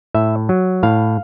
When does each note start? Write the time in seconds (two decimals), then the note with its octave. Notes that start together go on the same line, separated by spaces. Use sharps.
0.14 A2 E5
0.49 F#3
0.83 A2 F5